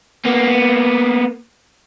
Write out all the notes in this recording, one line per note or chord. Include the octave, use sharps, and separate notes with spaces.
A#3 B3